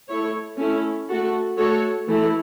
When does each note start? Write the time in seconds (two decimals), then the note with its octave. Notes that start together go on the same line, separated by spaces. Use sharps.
0.08 A3 E4 C#5
0.58 A3 C#4 E4
1.09 A3 F#4 A4
1.57 A3 F#4 A4 C#5
2.08 E3 A3 E4